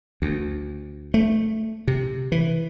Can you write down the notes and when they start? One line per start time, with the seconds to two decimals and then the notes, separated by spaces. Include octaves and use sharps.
0.22 D2
1.14 A3
1.88 C3
2.32 E3